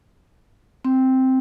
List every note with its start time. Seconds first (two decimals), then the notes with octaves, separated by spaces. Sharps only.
0.85 C4